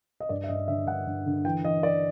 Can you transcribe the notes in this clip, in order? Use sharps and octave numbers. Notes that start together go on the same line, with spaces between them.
D#5
G2 D5
E5
G2 D#5
D3 E5
G2 F#5
G2
D3
E3 G5
E3 D#5
E3 D5